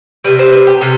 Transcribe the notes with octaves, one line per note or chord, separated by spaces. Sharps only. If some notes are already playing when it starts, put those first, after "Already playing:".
C3 G3 B4
C5
B4
G4
C3 G3 A4